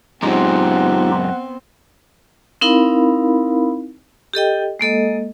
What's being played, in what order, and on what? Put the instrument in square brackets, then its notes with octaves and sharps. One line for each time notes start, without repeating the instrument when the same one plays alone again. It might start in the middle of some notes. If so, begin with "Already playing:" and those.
[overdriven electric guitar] F#2 G#3 [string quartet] B3 C4 [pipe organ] D#4 F4 G4 [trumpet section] F#5
[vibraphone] C4 D#4 E4 A#4 F5 B5
G4 A4 D#5 G5
G#3 A#3 A4 D#5